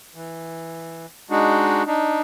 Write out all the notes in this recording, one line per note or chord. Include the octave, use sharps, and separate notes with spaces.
E3
G#3 D4 D#4 F#4
D4 D#4